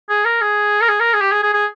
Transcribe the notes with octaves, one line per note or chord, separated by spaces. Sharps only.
G#4
A#4
G#4
A#4
G#4
A#4
G#4
G4
G#4
G#4
G#4